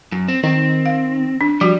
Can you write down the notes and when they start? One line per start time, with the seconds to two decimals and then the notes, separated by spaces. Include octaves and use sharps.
0.12 F#2
0.28 C4
0.43 D#3 C4
0.86 F5
1.41 D4
1.61 F3 G3 F#4